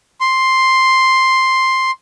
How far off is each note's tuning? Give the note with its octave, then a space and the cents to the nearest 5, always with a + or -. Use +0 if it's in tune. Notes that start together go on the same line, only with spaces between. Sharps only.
C6 +5